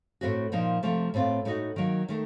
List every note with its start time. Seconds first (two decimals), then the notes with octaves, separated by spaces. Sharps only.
0.21 A2 A3 C4 F#4
0.52 A#2 F3 A#3 D#4
0.83 C3 F3 A3
1.14 A2 A3 C4 F4
1.45 A2 A3 D#4 F#4
1.76 D#3 F#3 A#3
2.08 D#3 A3